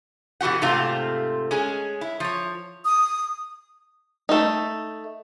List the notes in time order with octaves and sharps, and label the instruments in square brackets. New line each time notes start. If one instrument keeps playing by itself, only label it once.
[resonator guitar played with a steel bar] B2 E3 F#4 G4 F#5
G#2 C3 A3 C4 F4
G#3 C#4 G#4
E4
F3 C#5
[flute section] D#6
[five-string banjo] A3 D#4